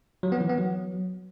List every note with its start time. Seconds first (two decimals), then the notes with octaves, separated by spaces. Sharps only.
0.23 F#3
0.32 B3
0.41 E3
0.49 B3
0.58 F#3